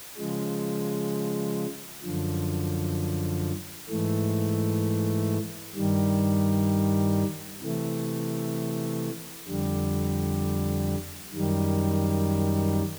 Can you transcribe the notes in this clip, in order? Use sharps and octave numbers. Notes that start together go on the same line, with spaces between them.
C#3 F3 G#3
F#2 D3 F3
G#2 E3 A3
G2 D#3 G3
C3 E3 A3
F2 D3 G3
F#2 D#3 G3